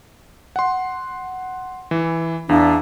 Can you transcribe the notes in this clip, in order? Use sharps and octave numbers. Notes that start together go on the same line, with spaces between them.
F#5 C6
E3
E2 D4 E5 F5